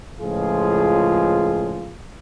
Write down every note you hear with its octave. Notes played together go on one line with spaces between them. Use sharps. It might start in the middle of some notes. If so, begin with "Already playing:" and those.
C#2 A2 F3 F4 G#4